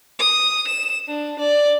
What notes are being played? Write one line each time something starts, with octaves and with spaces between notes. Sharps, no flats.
D#6
E7
D4
D5